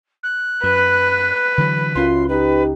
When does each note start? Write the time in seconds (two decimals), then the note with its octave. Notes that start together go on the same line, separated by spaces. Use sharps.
0.23 F#6
0.63 F#2 B4
1.58 D3 E3 F#3
1.95 C#2 F#2 C#4 F4 C6
2.28 D#4 G4 B4